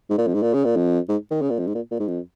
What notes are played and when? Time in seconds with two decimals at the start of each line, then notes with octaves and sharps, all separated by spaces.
0.10 G#2
0.18 A#2
0.27 F2
0.34 G#2
0.43 A#2
0.54 C#3
0.65 A#2
0.76 F2
1.09 G#2
1.31 D#3
1.42 C#3
1.50 A#2
1.59 F2
1.67 G#2
1.75 A#2
1.91 A#2
2.00 G#2
2.08 F2